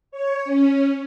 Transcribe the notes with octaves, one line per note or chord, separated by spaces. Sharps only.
C#5
C#4